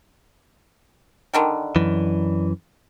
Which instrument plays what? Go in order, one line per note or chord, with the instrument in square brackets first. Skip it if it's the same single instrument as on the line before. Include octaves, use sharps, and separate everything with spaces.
[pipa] D3 D#3 G3
[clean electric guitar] F#2 E3